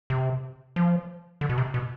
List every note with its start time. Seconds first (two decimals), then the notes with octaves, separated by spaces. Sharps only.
0.10 C3
0.76 F3
1.41 D3
1.49 B2
1.58 C3
1.74 B2